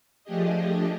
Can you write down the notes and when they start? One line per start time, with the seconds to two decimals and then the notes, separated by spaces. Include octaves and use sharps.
0.24 F3 A3 D4 G4 G#4 D#5